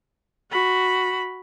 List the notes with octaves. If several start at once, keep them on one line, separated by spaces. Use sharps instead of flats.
F#4 B5